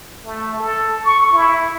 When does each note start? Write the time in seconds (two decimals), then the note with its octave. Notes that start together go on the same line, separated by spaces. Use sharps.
0.25 A3
0.59 A4
1.04 C#6
1.33 E4